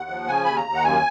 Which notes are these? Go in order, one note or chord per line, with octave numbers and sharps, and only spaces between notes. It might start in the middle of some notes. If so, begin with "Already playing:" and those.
Already playing: D#2 F#5
F3
C#3 G#5
D#2 B5
A#5
D#2
F#5
F#2 G#5